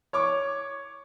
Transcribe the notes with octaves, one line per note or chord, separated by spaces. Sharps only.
C#5 C#6 D6